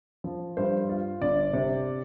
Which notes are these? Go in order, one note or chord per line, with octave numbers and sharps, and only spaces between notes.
F3
G2 C5
F4
G1 D5
C3